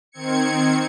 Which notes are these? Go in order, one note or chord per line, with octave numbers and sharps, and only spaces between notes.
D#3 C4 G#6 C#7